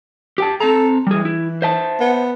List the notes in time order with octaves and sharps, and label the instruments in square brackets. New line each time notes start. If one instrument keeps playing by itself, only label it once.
[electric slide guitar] G4 G5 A5
[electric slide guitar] C4 A5 A#5 [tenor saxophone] A4
[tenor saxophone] E3 [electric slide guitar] G3 G#4
[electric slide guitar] E4
C5 E5 A5
[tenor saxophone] B3